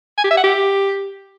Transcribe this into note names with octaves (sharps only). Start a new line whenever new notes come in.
G#5
G4
E5
F#5
G4